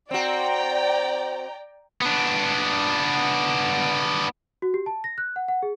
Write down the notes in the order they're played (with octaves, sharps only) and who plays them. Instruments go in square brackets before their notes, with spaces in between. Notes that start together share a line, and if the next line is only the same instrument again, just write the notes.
[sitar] C4 F#4 [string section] D5 G5 A#5
[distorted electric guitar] B3 D4
[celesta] F#4
G4
A5
A#6
F#6
F#5
F#5
G#4